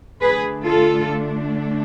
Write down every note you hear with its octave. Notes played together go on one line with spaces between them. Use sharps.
D3 A3 D4 G#4 B4
F4 A4